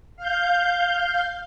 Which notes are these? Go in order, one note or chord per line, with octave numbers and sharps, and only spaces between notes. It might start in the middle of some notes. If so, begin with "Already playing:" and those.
F5 G6